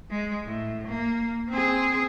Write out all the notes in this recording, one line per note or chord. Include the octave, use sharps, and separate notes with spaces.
G#3
A2
A#3
C4 G#4